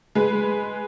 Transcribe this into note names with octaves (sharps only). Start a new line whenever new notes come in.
G#3 B4